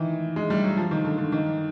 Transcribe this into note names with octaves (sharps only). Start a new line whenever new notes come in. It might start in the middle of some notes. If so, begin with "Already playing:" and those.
Already playing: D#3 E3
G#3
G3
F#3
F3
D#3
D3
D3
D#3